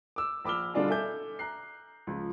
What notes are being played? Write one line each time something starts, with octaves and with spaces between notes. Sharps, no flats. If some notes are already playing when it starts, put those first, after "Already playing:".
D6 E6
A#1 B5 D6 E6 F6 G7
B2 D3 G3 D4 F4 G#4
A4 E5 G#5 D6 G6
A#5 F#6 C7
C#2 F3